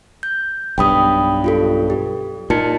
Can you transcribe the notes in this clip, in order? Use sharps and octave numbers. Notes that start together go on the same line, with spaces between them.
G6
B1 G2 G5 B5 D#6
F4 G4 A4
G4
A#2 D#4 A5 C#7